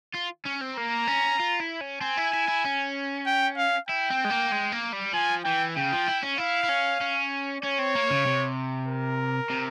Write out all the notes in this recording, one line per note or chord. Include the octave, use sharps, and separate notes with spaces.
F4
C#4
C4
A#3 A#5
C#4
F4
E4
C#4
C4 G#5
E4
E4
E4
C#4
G5
F5
E4 G5
C4
G#3
A#3
G#3
A#3
G3
F3 G#5
E3 G5
C#3 G5
F3
E4
C#4
E4 F5
E4
C#4
C#4
C#4 C#5
C4
A#3
C#3
C3
A#4
C3